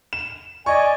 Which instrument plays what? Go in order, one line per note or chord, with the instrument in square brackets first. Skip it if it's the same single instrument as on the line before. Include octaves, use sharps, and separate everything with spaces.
[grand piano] E7
[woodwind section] D5 G#5 [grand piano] D#5 C#6